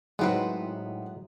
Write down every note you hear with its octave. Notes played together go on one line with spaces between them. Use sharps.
A2 F#3 G#3 B3 C4 D#4 B4